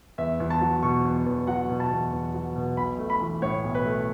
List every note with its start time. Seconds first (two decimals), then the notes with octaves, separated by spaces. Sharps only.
0.18 E2 E5
0.40 E2
0.50 A5
0.61 F#3
0.83 B2 C#6
1.04 E2
1.26 E2
1.47 F#3 F#5
1.69 B2
1.80 A5
1.91 E2
2.12 E2
2.34 F#3
2.56 B2
2.77 B1 B5
2.98 A3
3.10 B5
3.20 E3
3.42 A2 C#5
3.64 B1
3.75 B4
3.85 A3